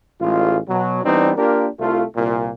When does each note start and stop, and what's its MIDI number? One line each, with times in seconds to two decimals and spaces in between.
0.21 0.58 33
0.21 0.58 56
0.21 0.58 65
0.69 1.04 47
0.69 1.04 54
1.04 1.32 52
1.04 1.32 55
1.04 1.32 59
1.04 1.32 60
1.04 1.32 62
1.04 1.32 63
1.37 1.68 58
1.37 1.68 62
1.37 1.68 65
1.37 1.68 67
1.37 1.68 70
1.79 2.03 36
1.79 2.03 57
1.79 2.03 65
2.16 2.51 36
2.16 2.51 46